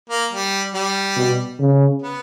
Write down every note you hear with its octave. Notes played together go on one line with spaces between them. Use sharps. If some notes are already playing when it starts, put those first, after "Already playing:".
A#3
G3
G3
B2
C#3
B3